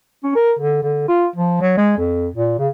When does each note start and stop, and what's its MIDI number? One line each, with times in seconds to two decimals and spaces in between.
0.24 0.31 61
0.35 0.53 70
0.59 0.82 50
0.82 1.05 50
1.08 1.26 65
1.36 1.58 53
1.61 1.74 54
1.77 1.94 56
1.98 2.28 41
2.34 2.57 46
2.59 2.68 49